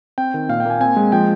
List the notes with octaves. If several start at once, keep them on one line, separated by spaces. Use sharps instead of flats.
C4 G5
D#3
A#2 F5
G5
A#3 G#5
C4 G#5
G#3
F3 G5